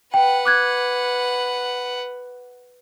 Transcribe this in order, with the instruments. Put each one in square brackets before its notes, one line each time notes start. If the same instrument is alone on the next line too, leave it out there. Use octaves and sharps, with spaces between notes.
[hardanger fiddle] B4 F#5 [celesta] G5
[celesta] D6 F#6 G#6